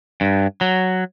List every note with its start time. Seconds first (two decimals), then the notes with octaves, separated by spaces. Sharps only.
0.21 G2
0.61 F#3